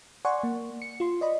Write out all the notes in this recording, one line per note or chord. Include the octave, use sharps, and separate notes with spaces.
D5 F#5 G#5 C6 C#6
A#3
C#7
F4 C6
D5 D#5 B5